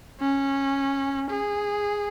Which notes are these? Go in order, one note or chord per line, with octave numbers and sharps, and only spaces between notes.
C#4
G#4